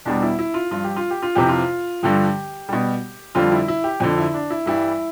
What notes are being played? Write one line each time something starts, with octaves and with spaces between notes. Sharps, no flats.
E2 B2 G3 D4
E4
E4
F4
G2 F3 F4
G4
F4
G4
F4
F2 C3 E3 G4
F4
G2 D3 F3 G4
B2 G3
F2 D3 G3 F4
E4
E4
G4
F2 D3 F3
E4
D4
E4
G2 E3 G3 E4